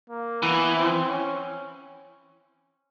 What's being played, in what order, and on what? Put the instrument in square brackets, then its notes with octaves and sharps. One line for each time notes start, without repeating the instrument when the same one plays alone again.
[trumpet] A#3
[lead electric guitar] E3 [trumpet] B3
[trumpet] C4
C#4